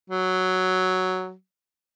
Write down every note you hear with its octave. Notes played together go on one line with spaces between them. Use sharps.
F#3